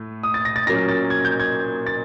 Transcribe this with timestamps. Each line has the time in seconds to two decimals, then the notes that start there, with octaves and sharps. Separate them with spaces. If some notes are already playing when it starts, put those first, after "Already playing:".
Already playing: A2 A3
0.23 D#6
0.34 A6
0.45 A#6
0.56 A6
0.67 A#2 F#3 A#3 C#4 A#6
0.89 A6
1.10 G#6
1.25 G6
1.40 G#6
1.86 A6